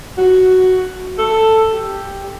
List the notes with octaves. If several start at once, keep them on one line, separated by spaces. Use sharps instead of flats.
F#4
A4
G4